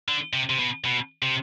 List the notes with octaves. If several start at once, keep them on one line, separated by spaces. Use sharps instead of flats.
D3
C3
C3
B2
B2
C3